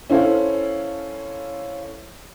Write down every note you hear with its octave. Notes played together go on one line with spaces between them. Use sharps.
C#4 E4 A4 C5 F5